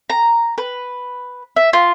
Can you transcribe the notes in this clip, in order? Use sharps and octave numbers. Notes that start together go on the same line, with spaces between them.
A#5
B4
E5
F4